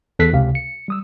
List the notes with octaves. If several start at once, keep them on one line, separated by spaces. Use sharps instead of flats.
E2 A4 F#6 B6 C7
C#2 C3 G4 F5
C#7
G3 D#6 E6